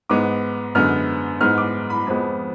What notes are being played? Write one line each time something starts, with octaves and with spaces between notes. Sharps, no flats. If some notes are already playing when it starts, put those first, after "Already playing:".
G#2 G#3 B3 D6
F#2 D3 G#3 B3 F6
G#2 G#3 B3 F6
D6
B5
F2 F3 G#3 B3